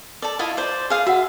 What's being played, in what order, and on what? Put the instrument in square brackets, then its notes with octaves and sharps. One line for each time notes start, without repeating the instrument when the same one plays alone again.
[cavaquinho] A4 D5
E4 F4 D#5
C5 D5
G#4 F5
[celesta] F#4 F#5 [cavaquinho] E5